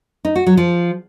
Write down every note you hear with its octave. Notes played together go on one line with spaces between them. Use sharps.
D#4
F#4
F#3
F3